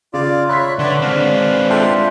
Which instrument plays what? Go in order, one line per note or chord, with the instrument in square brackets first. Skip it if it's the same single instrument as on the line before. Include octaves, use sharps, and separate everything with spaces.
[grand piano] C#3 [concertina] F4 D5
[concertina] C#5 E5 F#6 [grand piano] B5 C6 B6
[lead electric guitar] D3 [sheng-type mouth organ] D4 B4 [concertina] C#5 D5 F#5
[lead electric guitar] G#3 C4 [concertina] F5
[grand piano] F4 A4 E5 [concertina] G5 C6